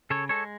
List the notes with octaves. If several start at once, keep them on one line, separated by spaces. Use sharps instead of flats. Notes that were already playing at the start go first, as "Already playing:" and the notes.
C#3 A4 C#5
G#3 A4 C#5